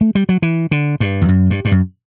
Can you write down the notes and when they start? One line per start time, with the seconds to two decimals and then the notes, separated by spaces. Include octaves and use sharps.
0.01 A3
0.15 G3
0.29 F#3
0.42 E3
0.71 D3
1.00 G2
1.22 E2
1.29 F#2
1.50 G2
1.65 G2
1.72 F#2